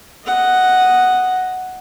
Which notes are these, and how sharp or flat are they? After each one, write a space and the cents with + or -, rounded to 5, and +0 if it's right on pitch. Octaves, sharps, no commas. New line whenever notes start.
D#5 +0 F#5 +0